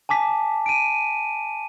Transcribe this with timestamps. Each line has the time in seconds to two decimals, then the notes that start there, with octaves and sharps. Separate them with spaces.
0.09 G#5 A5 D6 B6
0.66 D7 D#7